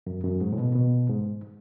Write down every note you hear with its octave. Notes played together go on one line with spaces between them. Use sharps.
F#2
F#2
G#2
A2
B2
B2
G#2